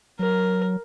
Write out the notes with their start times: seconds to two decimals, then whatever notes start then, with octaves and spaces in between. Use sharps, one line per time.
0.19 F#3 A#4